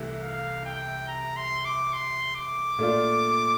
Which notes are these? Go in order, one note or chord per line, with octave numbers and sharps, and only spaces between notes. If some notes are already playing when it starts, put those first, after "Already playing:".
Already playing: C2 C3 E3 A3
F5
G5
A#5
C6
D6
C6
D6
A#2 A3 D4 F4